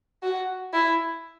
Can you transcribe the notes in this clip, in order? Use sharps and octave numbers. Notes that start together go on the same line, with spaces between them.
F#4
E4